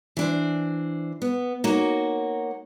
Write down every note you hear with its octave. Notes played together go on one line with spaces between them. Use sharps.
E3 D4 C5
B3
A#3 D#4 F#4 C#5